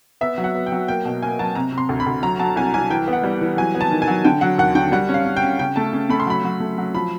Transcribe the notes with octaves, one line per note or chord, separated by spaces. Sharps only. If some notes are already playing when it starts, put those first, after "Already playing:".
B3 E5
F#3
F#5
B3
G5
F#3
A#3 G5
B2
A#3 G#5
F#3 A5
C3 A#5
C3
C6
D2
B5
D2
F#3 A#5
F#3 A5
C2 G#5
C2 G#5
E3 G5
B3
F#5
G3
E3
F#3 G#5
B3
A5
D#3
G#5
F#3
D3 G5
F#3 F#5
D#2 F#5
D3 G5
G3 F#5
C#4
F5
C#4
G5
C#4
C#3 G5
A3 A5
C#3
A3 B5
C6
F#3 B5
F#3
A3
F#3
F3 B5